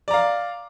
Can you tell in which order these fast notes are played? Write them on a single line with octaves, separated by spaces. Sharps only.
D5 A#5 F5